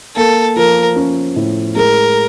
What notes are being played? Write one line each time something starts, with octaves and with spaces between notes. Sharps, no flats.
A#3 A4
F3 A#4
C#4
A2
G#3 A#4